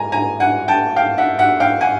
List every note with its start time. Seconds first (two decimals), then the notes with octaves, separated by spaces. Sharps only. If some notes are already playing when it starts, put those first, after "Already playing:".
Already playing: G#3 G#5 A#5
0.12 G#5 A#5
0.40 F#5 G#5
0.68 G5 A5
0.96 F5 G5
1.18 E5 F#5
1.39 E5 F#5
1.60 F5 G5
1.81 F#5 G#5